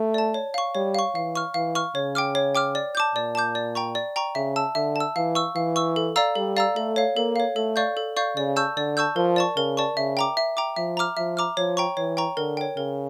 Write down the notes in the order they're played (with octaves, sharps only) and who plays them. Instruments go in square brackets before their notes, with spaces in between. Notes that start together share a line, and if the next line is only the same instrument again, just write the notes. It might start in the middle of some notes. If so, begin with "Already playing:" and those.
Already playing: [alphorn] A3
[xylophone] D5 A5
C#5
F5 C#6
[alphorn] G3 [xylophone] C#5
[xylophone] F5 C#6
[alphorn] E3 [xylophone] F5
[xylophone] C#6 F6
[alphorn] E3 [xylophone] F5
[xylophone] C#6 F6
[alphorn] C#3 [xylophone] C#5
[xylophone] G5 D6 F6
C#5
G5 D6 F6
D5
A5 D6 G6
[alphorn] A#2 [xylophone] D5
[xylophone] A5 D6 G6
D5
G5 A#5 C#6
D5
G5 A#5 C#6
[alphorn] C#3 [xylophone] E5
[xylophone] A5 E6
[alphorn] D3 [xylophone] E5
[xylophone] A5 E6
[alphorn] E3 [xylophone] F5
[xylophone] C#6 E6
[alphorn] E3 [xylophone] F5
[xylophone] C#6 E6
A4
D5 F5 A#5 E6
[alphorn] G3 [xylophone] A4
[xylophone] D5 F5 A#5 E6
[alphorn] A3 [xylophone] A4
[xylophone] C#5 F5
[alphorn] A#3 [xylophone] A4
[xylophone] C#5 F5
[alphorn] A3 [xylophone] A4
[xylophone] D5 F5 C#6 G6
A4
D5 F5 C#6 G6
[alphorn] C#3 [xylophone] D5
[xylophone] A5 C#6 E6 G6
[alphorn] D3 [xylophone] D5
[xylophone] A5 C#6 E6 G6
[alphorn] F3 [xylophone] A#4
[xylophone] D5 A5 C#6
[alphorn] C#3 [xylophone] A#4
[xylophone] D5 A5 C#6
[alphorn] C#3 [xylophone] E5
[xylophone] G5 A#5 D6
E5
G5 A#5 D6
[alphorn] F3 [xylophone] E5
[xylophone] A#5 D6 F6
[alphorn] F3 [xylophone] E5
[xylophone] A#5 D6 F6
[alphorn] F3 [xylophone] C#5
[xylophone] G5 A#5 C#6
[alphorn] E3 [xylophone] C#5
[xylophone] G5 A#5 C#6
[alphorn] D3 [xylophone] A#4
[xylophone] C#5 G5
[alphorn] C#3 [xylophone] A#4